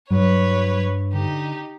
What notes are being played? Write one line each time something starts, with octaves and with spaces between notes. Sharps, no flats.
G2 F#3 B4 C#5
D3 D#4 G4